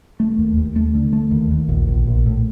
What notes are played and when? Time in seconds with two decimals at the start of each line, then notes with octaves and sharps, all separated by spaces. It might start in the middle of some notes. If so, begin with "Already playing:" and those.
0.20 A3
0.38 D#2
0.57 D#2
0.76 A3
0.94 D3
1.13 A3
1.31 D#2
1.51 D#2
1.69 A#1
1.88 A#1
2.07 A#1
2.26 A2